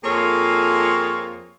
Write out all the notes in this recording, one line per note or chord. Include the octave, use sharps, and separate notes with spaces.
F2 A#3 F4 G#4 A4 C#5